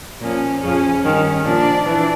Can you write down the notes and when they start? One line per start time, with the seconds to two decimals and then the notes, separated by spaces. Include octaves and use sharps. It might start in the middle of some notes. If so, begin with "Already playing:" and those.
0.20 A#2 F3 C#4
0.61 F2 C#3 F3 C#4
1.03 G2 D#3
1.44 A#2 F3 D4
1.86 E3 D4